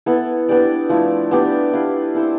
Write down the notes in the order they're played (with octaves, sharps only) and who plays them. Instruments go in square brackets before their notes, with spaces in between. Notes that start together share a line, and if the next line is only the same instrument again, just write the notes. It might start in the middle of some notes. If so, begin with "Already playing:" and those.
[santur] B3 E4 A4
B3 D4 G4 D5
F3 A3 E4
B3 D4 G4
E4 G4 B4 F5
C4 E4 A4 C5